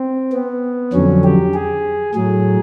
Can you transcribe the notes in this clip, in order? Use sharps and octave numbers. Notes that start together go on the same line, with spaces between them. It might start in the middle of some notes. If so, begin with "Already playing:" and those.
Already playing: C4
B3
F2 D3 F#3 C#4
G4
G#4
A2 F#3 G#4